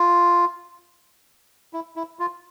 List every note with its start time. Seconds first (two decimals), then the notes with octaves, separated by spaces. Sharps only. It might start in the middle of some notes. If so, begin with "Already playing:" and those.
Already playing: F4
1.73 E4
1.96 E4
2.19 F4